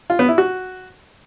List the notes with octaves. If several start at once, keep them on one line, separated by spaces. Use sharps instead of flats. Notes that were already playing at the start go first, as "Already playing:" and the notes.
F4
B3
E4
F#4